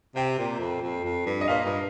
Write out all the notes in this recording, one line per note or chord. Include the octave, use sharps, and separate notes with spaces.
C3 G5
A#2
F2
F2
F2
G2
D#5
A#2 F5
G2